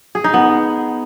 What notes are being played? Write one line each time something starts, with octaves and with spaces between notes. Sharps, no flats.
G#4
D#4
B3